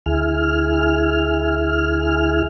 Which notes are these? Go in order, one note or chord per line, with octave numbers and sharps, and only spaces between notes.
D2 E4 G#4 F6